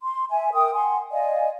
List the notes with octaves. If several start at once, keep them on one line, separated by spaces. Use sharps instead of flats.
C6
E5 G#5
A#4 G5 D#6
F#5 G#5 C6
D5 D#5 F5 G#5